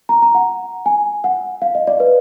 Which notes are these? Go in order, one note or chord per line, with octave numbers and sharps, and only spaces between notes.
A#5
A#5
F#5
G#5
F#5
F5
D#5
D5
B4